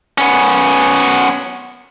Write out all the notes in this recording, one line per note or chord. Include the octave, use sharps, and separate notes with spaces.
B3 C#4